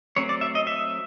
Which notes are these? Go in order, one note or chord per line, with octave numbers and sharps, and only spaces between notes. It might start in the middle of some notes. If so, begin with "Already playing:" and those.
F#3 A3 C4 C#5
D5
E5
D#5
E5